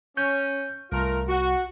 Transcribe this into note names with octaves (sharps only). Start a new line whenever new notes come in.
C#4 G6
C2 A3 F4 A#4
F#4